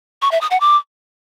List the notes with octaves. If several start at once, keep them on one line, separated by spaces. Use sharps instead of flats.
C#6
E5
D#6
F#5
D6